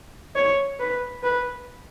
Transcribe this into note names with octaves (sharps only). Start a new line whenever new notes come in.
C#5
B4
B4